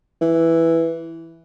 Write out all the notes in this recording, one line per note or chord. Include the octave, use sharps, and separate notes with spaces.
E3